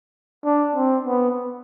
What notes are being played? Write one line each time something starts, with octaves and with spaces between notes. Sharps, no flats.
D4
C4
B3